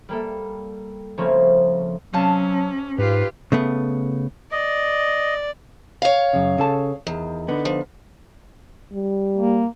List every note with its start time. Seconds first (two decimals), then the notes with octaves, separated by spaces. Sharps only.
0.09 G3 A#3 A4
1.17 C#3 F3 A3 A#3 C4 C#4
2.13 C3 F#3 C#4 F5 A5
2.98 G#2 F4 G4 B4
3.52 C#3 A3 B3
4.52 D5 D#5
6.02 C#5 F5
6.33 F#2 C#3
6.58 C#3 A4 A5
7.07 E2 D#3
7.48 D3 B3 D#4
7.65 F3
8.93 G3
9.37 A#3